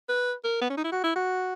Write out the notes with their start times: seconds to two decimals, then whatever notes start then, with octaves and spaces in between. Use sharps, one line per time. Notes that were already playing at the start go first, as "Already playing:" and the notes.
0.09 B4
0.44 A#4
0.61 B3
0.70 C#4
0.77 D#4
0.84 E4
0.92 F#4
1.04 E4
1.16 F#4